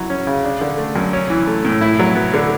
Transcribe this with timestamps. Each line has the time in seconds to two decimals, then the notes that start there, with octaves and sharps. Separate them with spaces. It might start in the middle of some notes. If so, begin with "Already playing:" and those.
Already playing: F#3 E4
0.10 C#4
0.27 C#3
0.44 D4
0.61 D3
0.78 A3
0.96 F#2
1.13 C#4
1.30 E3
1.47 A3
1.65 A2
1.81 E4
1.99 F#3
2.15 B3
2.34 D3